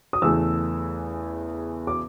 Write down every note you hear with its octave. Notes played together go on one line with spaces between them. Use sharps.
D#6
E2 C#3 E3 A3 E6
D6